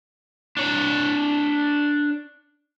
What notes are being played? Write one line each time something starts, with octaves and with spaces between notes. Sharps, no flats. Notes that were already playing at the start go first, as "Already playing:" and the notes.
D4 C#5